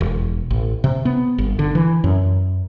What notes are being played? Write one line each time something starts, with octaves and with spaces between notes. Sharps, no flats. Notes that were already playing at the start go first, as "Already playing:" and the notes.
E1
A1
C3
B3
G1
D3
E3
F#2